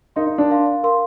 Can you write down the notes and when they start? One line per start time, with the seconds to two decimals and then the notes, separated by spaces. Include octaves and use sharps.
0.16 D#4 A#4 F5 C6
0.27 D#4
0.38 D4
0.50 A#4 F5 C6
0.83 A#4 F5 C6